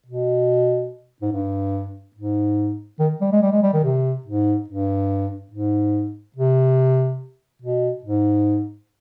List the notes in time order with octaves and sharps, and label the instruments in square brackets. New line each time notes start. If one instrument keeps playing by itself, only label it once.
[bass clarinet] B2
G#2
G2
G#2
D#3
G3
G#3
G3
G#3
G3
D#3
C3
G#2
G2
G#2
C3
B2
G#2